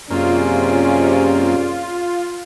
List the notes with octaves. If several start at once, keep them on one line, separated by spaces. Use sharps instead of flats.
F#2 C3 A#3 C#4 F4 G#4 D5